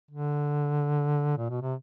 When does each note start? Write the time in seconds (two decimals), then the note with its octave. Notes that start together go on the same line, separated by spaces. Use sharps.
0.11 D3
1.38 A#2
1.49 B2
1.62 C3